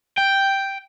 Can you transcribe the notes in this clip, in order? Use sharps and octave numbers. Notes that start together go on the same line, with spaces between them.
G5